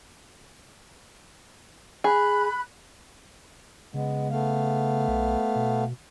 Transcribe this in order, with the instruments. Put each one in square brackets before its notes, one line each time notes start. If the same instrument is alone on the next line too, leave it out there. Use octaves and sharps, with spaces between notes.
[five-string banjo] G#4 [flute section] B5 F#6
[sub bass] C#3 [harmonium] G#3 B3
[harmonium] A3 B3 F5
[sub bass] B1
B2